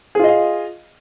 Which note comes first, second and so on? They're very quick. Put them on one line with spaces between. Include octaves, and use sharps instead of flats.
G#4 F4 D#5 F5